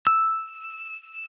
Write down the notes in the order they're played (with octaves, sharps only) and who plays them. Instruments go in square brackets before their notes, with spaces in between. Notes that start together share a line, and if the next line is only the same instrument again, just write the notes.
[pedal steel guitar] E6